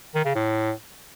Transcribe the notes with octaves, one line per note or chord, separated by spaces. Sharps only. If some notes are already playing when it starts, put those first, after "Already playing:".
D#3
C#3
A2